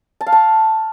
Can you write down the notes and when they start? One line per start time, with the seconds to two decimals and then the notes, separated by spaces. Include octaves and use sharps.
0.21 A5
0.26 F5
0.32 A5